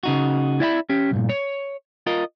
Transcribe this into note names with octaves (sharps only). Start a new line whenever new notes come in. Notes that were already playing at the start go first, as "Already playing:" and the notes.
C#3 D#4 F#4
E4 D5 E5 F5 B5
C#4 G4
B1 G2 A#2
C#5
F4 A#4 D#5